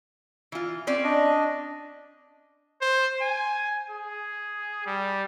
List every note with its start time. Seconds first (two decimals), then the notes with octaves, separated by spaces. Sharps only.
0.52 E3 F4
0.87 C4 C#4 D5
1.04 D4 D#5
2.82 C5
3.21 G#5
3.90 G#4
4.86 G3